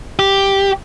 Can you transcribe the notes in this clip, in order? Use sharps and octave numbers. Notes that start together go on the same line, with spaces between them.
G4